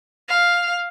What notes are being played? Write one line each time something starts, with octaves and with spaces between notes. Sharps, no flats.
F5